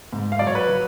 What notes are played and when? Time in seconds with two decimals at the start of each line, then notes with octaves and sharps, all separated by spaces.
0.13 G#2
0.32 F5
0.39 F#3 D5
0.47 C#5
0.55 B4
0.69 F#3